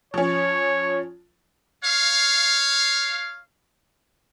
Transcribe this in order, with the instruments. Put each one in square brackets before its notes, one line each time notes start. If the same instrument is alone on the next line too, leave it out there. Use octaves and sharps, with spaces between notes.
[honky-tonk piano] F3 C#4 [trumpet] C#5
[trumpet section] C#5 F5